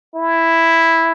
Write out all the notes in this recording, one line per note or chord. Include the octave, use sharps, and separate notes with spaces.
E4